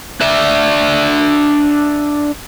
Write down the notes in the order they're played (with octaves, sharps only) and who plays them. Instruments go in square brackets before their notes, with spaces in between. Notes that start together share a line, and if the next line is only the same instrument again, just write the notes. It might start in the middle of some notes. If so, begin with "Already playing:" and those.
[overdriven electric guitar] D4 E5